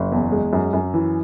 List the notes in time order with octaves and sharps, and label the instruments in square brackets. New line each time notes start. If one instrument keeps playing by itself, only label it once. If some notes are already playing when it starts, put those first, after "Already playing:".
Already playing: [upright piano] F#1
E2
G#3
F#2
F#2
E3